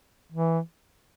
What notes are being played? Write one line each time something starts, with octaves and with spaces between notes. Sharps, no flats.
E3